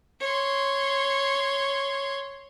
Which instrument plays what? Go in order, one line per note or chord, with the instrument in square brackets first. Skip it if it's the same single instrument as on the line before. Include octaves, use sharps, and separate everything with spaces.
[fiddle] C#5 C6